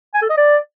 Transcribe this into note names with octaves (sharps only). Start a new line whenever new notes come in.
G#5
A4
D#5
D5